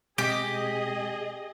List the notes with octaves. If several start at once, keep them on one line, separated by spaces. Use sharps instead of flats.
B2 G#3 C4 G4 G#4 D#5